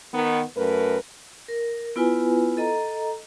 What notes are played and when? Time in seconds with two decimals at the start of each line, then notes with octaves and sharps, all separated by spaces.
0.14 D#3 B3
0.57 F#2 A3 A#4 B4
1.48 A#4
1.96 B3 E4 F4 B4 G#5
2.57 A4 D#5 A#5